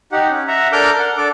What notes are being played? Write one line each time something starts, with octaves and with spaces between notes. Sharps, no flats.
D#4 G4 F#5
C#4
E5 F#5 A#5
D4 A4 A#4 D6 F6 G6
F#5
D4 A4 D6